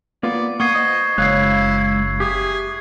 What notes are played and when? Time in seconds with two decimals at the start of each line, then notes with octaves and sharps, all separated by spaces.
0.23 A#3 B3 F4 D5
0.60 A#3 F#5 C#6 D#6 G#6 C7
0.75 C5 D#5
1.18 F#1 G#3 E4 C#5 F5 F#6 C7
2.20 G4 G#4 E5